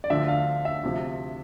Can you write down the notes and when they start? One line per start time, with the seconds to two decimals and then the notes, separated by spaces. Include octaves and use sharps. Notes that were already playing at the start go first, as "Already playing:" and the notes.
0.04 D5
0.10 D2 D3 F3 E5
0.28 F5
0.65 E5
0.83 D2 C3 F3